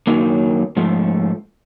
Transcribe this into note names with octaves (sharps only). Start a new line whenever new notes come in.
F#2 D#3 F#3 A#3
G#2 F3 A3